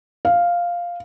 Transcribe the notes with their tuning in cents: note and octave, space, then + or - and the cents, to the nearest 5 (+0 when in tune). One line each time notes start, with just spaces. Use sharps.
F5 +0